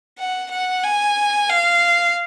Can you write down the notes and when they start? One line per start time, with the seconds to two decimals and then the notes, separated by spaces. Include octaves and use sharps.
0.19 F#5
0.51 F#5
0.84 G#5
1.49 F5